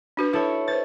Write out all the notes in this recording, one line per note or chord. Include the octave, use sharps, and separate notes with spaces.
D4 F#4 B4
E4 F#4 A4 B4 C#5
B4 C5 A6